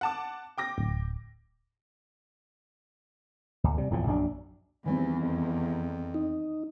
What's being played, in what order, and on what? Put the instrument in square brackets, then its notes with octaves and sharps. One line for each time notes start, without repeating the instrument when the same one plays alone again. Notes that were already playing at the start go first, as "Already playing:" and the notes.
[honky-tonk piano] F#5 A5 D6
G5 D6 A#6
[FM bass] D1
[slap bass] D2
C3 G3
D1 E2 A2 F3
A#1 F#2 C#4 D4
[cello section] E2 [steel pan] D#3 G3 C4 [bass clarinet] E3
[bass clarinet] F2
[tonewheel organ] D#4